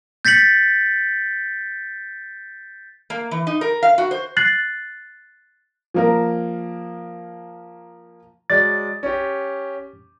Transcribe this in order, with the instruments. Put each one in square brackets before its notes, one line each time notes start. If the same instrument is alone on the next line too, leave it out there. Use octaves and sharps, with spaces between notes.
[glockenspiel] G6 A6 B6 C#7 F#7
[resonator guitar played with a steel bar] A#3
E3
D#4
A#4
F5
F#4
C5
[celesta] F#6 A6 C7 F#7
[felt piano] F3 A#3 A#4
[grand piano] F#3 G#3 D5 [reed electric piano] A6
[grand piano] C#4 G4